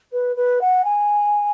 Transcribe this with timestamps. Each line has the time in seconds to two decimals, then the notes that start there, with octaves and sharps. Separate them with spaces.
0.12 B4
0.36 B4
0.61 F#5
0.84 G#5